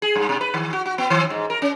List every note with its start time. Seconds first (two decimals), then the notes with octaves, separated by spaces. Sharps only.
0.02 G#4
0.15 G2
0.29 B2
0.41 B4
0.54 D#3
0.73 F#4
0.86 F#4
0.98 B3
1.10 D#3
1.30 G#2
1.50 A#4
1.62 C#4